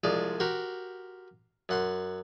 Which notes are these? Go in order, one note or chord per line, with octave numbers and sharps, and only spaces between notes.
C2 F3 G#3 D5
F#4 G4 A#4 C5
F#2 F#5 C6